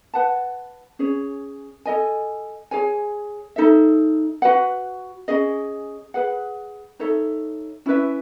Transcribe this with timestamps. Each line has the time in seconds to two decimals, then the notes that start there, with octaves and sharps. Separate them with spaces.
0.14 B4 F#5 A5
0.99 C#4 G#4 C#5
1.85 A4 D#5 G#5
2.71 G#4 C#5 G#5
3.56 D#4 A4 E5
4.42 F#4 B4 F#5
5.28 C#4 G#4 D#5
6.14 G#4 B4 F#5
6.99 D#4 A4 C#5 E5
7.86 C#4 E4 B4 E5